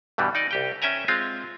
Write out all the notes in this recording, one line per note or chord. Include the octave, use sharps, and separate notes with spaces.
G2 B2 E3 G3
D#4 D5 D#5
C2 G4 G5
C#4 E5 G5 G#5 A#5
G#3 C4 F4 F5